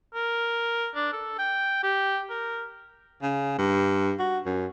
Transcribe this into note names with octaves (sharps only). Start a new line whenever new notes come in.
A#4
D4
A4
G5
G4
A#4
C#3
G2
F#4
F#2